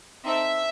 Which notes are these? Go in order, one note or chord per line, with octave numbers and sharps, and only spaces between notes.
C4 D#4 A4 E5